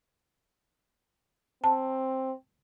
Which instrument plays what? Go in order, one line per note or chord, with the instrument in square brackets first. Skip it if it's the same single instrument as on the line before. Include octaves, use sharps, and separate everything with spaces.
[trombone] C4 [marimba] A5